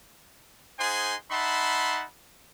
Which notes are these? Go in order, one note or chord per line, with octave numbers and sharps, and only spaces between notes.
D#4 G#4 C5 F#5 G#5 C6
D#4 E5 F#5 A5 B5 C6